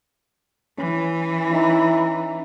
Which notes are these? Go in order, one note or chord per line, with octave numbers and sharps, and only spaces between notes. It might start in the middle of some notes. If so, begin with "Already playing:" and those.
E3 C#4
C#4 D#4 E4 A#5